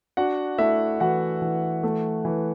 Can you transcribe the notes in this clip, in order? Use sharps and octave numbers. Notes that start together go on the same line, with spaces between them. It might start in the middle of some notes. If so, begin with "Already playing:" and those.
D4 F#4 F#5
A3 E4 E5
E3 F#4 F#5
E3
A3
E3